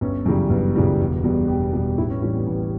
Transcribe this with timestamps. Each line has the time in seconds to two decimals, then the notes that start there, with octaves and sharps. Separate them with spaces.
0.01 G1 C#4
0.26 F#2 C#3 E3 G3
0.50 G1
0.76 F#2 C#3 E3 G3
1.00 E1
1.24 E2 B2 G3
1.48 E1 G4
1.73 E2 B2 G3
1.97 A1 E4
2.10 C#4
2.22 A2 E3 G3 C#4
2.35 B3
2.47 A1 B3